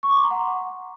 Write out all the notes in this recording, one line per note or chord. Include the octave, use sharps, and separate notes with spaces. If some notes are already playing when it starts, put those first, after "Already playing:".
C#6
D6
C6
A#5
F#5